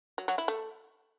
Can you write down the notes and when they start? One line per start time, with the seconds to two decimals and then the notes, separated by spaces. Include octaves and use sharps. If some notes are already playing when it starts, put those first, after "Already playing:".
0.18 F#3
0.28 F#3
0.38 E4
0.48 A3